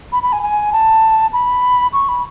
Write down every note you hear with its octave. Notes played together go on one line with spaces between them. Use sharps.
B5
B5
G#5
G#5
A5
B5
C#6
B5